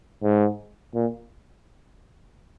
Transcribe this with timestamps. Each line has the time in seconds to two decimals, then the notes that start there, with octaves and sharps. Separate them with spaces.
0.23 G#2
0.95 A#2